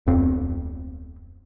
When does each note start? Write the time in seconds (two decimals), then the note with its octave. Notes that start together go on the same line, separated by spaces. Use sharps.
0.07 D1 F2 C4